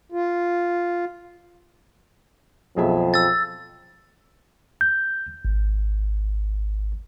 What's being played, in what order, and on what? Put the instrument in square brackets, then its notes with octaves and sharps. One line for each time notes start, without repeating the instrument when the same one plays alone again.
[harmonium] F4
[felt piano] B1 G#4 E5 [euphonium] F2
[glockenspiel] E6 A6
[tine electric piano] G6
G#1